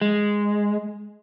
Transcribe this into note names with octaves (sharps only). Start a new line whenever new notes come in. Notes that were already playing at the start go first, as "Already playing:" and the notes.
G#3